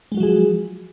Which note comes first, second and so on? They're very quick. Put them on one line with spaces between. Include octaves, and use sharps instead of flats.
G#3 F#3 F#4 F3 G#4